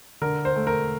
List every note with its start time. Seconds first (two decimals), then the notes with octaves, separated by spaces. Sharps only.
0.22 D3 A#4
0.45 C5
0.56 A3
0.67 A#4